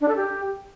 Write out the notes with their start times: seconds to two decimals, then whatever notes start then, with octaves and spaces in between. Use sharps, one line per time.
0.01 D4
0.08 A4
0.16 G4